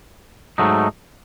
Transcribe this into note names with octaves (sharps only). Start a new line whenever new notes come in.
G#2 F#3 A3 D#4